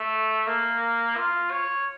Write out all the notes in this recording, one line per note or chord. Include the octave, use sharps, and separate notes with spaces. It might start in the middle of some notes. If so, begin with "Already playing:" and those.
Already playing: A3
A#3
F4
C#5